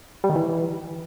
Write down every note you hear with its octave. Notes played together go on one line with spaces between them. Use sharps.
G3
D#3
E3